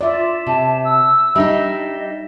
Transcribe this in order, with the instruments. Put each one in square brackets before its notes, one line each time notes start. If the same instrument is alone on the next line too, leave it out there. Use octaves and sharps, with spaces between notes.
[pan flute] F4 [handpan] D5 E5
[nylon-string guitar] C3 [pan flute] A5
[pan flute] E6
[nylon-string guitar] G3 D4 D#4 [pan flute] D#5 [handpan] E5